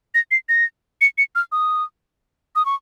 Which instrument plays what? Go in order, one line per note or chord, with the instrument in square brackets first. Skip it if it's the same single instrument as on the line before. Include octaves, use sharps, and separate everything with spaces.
[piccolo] A#6
C7
A#6
C#7
C#7
F6
D#6
D#6
C#6